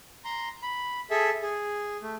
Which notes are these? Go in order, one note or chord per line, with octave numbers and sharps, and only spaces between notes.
A#5 C6
B5
G#4 A4 E5
G#4
A3